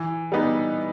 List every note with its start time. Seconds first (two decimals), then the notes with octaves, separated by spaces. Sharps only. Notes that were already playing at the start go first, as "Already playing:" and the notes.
Already playing: E3
0.32 G3 B3 D#4